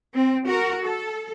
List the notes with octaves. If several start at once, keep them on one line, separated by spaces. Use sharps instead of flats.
C4
F#4 A#4
A4